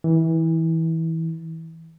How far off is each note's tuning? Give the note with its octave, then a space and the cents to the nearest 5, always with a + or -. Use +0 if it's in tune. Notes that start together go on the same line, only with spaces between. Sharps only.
E3 -25